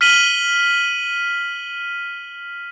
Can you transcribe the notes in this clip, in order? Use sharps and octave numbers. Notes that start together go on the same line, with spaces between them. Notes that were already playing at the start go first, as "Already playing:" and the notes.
F6 B6 D#7 F#7 G7